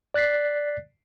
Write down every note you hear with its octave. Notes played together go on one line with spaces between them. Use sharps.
D5 F#6 A6 B6 C7